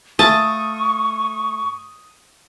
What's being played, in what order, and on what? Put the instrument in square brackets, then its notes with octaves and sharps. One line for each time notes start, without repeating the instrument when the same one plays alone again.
[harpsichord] A3 F4 [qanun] A5 [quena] C#6 [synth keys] D#6